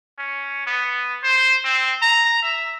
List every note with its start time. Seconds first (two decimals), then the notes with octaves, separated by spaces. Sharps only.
0.18 C#4
0.67 B3
1.24 C5
1.65 C4
2.02 A#5
2.42 E5